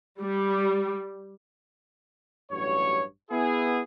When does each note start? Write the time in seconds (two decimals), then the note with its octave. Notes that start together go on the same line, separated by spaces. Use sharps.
0.20 G3
2.51 A1 G2 F#3 C#5
3.30 B3 E4 G#4